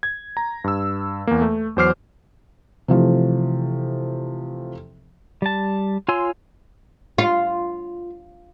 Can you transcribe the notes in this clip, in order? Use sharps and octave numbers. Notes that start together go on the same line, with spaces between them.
G#6
A#5
G2 E6
E2 A#3
A3
E2 F#3 C5 D6 F6 C7
C3 E3 F3 A3
G3 A5
F4 C#5 G#5 C6 E6
F4